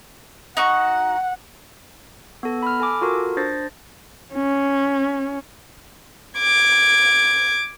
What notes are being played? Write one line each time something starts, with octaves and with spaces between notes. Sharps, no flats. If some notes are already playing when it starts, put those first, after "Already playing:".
D#4 F#4 F#5 C#6
B3 A4
B5 F6
A4 G#5 D6
F4 F#4 A4 A#4
D4 C5 A6 A#6
C#4
D6 G#6